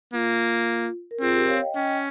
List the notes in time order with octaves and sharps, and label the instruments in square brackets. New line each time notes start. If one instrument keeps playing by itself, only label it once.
[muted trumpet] A#3 [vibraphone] F4
[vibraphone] A#4
[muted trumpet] C4 [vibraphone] F4 G#4
[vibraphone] G4 A#4
C#5 F5
D#5 G5
[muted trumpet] C#4 [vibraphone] D#5 G5